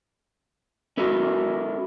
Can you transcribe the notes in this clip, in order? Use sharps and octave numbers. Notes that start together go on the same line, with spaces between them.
C#4 E4 F#4 A4 A#4